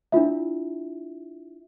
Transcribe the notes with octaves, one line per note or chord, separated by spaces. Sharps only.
D4 E4 F4 E5